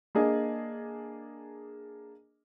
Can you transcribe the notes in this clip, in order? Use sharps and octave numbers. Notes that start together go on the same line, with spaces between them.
A#3 D4 G#4 D#5